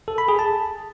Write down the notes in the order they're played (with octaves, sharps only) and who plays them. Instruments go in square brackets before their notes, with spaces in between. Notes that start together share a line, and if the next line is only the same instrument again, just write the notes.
[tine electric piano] A4
B5
G#4
A5